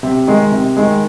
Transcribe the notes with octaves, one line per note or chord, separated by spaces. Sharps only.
C3
D#3 G#3
C3
D#3 G#3